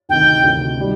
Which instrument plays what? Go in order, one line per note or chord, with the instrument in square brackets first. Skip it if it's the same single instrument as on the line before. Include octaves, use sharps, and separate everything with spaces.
[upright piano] D2 C3 D#3 [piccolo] G5
[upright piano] D2 C3 D#3
D#3 G3